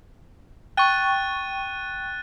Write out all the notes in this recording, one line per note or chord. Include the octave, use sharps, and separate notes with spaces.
G5 C#6 F#6 A6 D#7